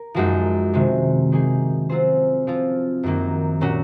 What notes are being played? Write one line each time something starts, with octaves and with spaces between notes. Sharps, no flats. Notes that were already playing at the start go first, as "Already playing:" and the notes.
Already playing: A#4
F#2 F3 G#3 D#4 F#4
C3 D#3 G#3
D#3 A#3 D#4 G#4
F#3 C4 F4 G#4 C5
F3 C4 F4
F#2 D#3 F#3 A#3
A#2 F#3 C#4 F#4